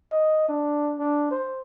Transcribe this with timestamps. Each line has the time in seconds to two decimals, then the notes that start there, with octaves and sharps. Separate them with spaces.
0.12 D#5
0.49 D4
0.99 D4
1.31 C5